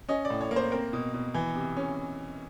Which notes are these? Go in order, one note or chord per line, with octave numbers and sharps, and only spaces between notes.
C#4 D#5
D5
A2
C#5
A#3
C5
C4 A#4
B2
B2
E3
C3
C#4